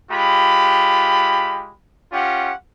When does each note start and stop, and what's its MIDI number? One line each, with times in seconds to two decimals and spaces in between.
0.11 1.72 56
0.11 1.72 65
0.11 1.72 67
0.11 1.72 83
2.13 2.53 61
2.13 2.53 65
2.13 2.53 67
2.13 2.53 78